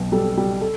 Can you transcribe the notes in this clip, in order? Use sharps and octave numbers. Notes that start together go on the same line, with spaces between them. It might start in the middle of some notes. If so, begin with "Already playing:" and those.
Already playing: B1 B2
G3 A4
G3
A4